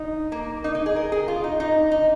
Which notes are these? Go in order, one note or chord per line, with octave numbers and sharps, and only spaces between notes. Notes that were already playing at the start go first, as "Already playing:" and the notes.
Already playing: D#4
A#3
D#4
D#4
G#4
A#4
G#4
F4
D#4
D#4
D#4